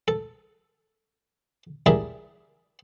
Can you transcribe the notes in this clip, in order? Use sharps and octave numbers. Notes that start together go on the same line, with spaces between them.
A4
E4 G4 G#4 A#4 D5 E5